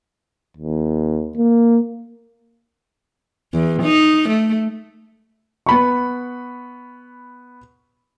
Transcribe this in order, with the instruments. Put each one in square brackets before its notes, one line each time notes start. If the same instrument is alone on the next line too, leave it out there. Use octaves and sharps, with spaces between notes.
[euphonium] D#2
A#3
[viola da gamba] E2
D#4
A3
[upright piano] B3 B5 C#6